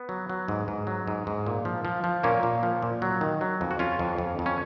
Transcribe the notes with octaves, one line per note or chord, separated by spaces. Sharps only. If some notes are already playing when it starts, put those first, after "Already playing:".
Already playing: B3
F#3
F#3
G#2
G#2
F#3
G#2
G#2
A#2
F3
F3
F3
A#2 A#3 C#4
A#2
F3
A#2
F#3
D#3
F#3
F2
F#4
F2 C#4 F4
F2
F2
F2
C#4